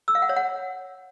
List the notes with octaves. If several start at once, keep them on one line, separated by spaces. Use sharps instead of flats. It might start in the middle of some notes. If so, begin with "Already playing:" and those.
E6
F5
F#5
C#5
F#5